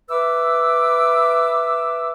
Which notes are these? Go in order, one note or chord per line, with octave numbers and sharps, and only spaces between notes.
B4 E5 D6 E6